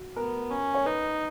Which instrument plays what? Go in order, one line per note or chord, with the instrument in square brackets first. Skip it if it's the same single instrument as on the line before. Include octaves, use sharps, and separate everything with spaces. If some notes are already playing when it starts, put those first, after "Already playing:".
Already playing: [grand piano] F#4
[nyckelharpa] B3 [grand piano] A#4
[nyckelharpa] C#4
[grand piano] C#5
[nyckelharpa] D#4 [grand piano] B4